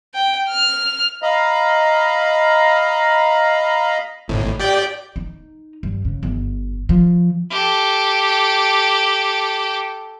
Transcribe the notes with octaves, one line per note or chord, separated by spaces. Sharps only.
G5
F6
D#5 F5 A#5 B5
G#1 A2
G4 D5 G5
D#4
G2
C#3
G1
F3
G4 A4